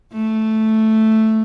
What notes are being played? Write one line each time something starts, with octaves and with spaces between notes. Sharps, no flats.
A3